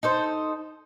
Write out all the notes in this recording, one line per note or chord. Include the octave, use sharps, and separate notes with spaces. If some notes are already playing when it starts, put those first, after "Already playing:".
D#4 A4 C5